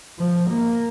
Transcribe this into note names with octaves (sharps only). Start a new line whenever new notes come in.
F3
A#3